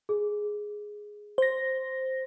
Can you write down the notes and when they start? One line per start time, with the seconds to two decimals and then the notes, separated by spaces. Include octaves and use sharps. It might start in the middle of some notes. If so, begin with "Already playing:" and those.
0.09 G#4
1.38 C5 A#6